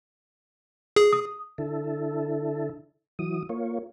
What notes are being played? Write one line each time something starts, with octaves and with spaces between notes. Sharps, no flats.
G#4
D#6
D3 E4 A4
E3 F#3 D#6
A#3 F4 C#5